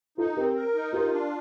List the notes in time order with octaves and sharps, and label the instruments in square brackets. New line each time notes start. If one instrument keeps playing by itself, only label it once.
[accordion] D#4 [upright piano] F4 A4
[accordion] C4 [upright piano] G4 A#4
[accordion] A#4
D#4
[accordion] F4 [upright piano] G4 A#4
[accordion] D4